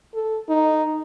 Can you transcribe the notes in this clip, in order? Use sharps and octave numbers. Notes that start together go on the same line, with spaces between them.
A4
D#4